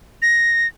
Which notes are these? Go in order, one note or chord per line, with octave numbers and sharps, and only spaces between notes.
A#6